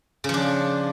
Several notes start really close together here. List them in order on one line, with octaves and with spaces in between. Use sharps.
C#3 F3 D4